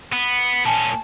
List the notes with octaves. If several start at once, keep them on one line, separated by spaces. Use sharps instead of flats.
B3
A#2 C#4 G#5 A5